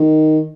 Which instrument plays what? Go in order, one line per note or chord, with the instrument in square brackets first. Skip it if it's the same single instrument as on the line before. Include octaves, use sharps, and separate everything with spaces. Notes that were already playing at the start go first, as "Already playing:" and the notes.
Already playing: [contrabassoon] D#3